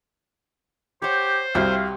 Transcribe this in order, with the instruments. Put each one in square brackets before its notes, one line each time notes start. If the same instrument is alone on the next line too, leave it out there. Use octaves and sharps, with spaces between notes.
[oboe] G4 [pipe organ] C5 [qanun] C#5 F#5
[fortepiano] C2 [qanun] C3 C4 F#4 [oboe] F5